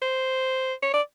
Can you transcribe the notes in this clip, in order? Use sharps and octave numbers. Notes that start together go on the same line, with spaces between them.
C5
C#5
D5